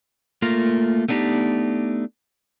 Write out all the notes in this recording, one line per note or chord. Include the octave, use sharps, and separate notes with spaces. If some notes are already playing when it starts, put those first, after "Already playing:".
A3 A#3 F4 A#4
A3 B3 D4 D#4 G4